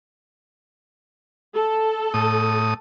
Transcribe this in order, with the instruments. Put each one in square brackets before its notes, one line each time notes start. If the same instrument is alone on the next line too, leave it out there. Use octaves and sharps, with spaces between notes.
[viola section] A4
[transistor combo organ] A2 D#6